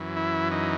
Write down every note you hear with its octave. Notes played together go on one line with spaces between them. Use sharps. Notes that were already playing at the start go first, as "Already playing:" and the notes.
Already playing: F#2 E3
E4
D#4